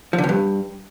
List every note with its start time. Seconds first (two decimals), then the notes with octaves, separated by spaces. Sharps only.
0.13 F3
0.18 D3
0.24 F2
0.29 G2